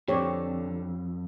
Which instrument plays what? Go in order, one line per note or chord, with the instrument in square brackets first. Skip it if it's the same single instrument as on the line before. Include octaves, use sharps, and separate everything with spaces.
[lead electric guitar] F2 [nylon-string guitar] D3 C4 [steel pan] G4 C#5